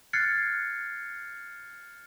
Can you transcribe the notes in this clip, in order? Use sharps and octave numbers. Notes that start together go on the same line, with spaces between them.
F6 F#6 G#6 A6 C7 C#7